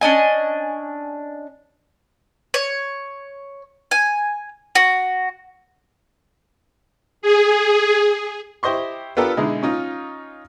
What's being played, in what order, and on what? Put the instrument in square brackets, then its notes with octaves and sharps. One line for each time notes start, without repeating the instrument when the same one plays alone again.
[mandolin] C#4 D4 D#5 G#5
C#5
G#5
F#4
[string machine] G#4
[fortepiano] E4 G4 C5 D#5 C6 C#6
B3 D4 F4 G4 A4 A#4
B2 D3 G#3 D#4 E4
C#4 D#4 F4